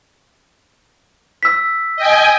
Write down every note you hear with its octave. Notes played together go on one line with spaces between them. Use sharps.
E6 B6
D#5 G5 G#5